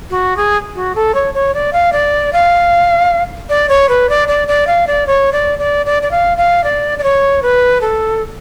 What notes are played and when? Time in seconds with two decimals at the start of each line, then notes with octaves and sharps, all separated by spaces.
0.10 F#4
0.37 G#4
0.75 F#4
0.95 A4
1.15 C#5
1.34 C#5
1.54 D5
1.73 F5
1.93 D5
2.33 F5
3.50 D5
3.69 C#5
3.89 B4
4.09 D5
4.28 D5
4.48 D5
4.67 F5
4.87 D5
5.07 C#5
5.33 D5
5.59 D5
5.86 D5
6.03 D5
6.11 F5
6.38 F5
6.64 D5
6.99 D5
7.04 C#5
7.43 B4
7.81 A4